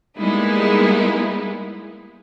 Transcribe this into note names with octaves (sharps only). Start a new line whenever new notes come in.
G3 G#3 A#3 B3 D#4 E4